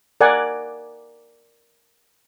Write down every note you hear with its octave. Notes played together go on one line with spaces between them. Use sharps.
A#4 D5 F#5 G#5